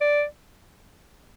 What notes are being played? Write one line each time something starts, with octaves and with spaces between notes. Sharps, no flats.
D5